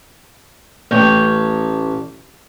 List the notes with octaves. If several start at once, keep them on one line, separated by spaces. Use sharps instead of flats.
A1 C#5 G5